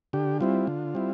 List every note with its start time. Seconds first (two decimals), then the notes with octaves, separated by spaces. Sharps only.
0.13 D3 G4
0.40 G3 C4 E4 F4
0.67 D3
0.95 G3 C4 E4